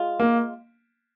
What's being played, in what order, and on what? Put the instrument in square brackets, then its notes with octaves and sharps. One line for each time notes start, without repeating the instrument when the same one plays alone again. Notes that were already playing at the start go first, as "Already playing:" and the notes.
Already playing: [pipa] G#3 F4
[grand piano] A#3